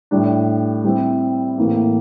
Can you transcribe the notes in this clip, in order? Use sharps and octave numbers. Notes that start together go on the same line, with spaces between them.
A2 G3 D4
G3 C4 E4
A2 E3 A#3